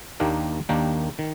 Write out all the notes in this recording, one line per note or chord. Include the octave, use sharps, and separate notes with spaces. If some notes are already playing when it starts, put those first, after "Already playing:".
D#2 D#3 A#3 D4 G4
D#2 D#3 A#3 D4 G4
D#3